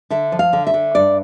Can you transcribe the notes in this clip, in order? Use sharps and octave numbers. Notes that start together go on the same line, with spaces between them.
D3 E5
F3
F5
D3
E5
D3
G2 D5